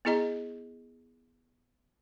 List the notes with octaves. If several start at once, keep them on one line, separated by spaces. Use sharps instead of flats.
B3 E4 G#4 D#5 A#5